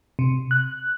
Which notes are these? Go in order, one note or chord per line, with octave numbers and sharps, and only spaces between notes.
C3
F#6